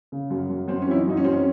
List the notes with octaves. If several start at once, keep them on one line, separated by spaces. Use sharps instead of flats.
C#3
F#2
F#2
F#2 C4
C#4
E3 E4
D#4
F#2 D#4
C#4
F#2 C4
C#4